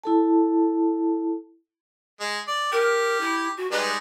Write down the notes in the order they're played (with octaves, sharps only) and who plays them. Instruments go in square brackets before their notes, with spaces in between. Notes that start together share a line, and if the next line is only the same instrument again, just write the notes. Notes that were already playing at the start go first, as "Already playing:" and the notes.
[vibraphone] E4 A4 A5
[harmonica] G#3
D5
[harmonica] G4 [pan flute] A#4
[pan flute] E4
F#4
[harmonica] G3 G#3 D#4 [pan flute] B4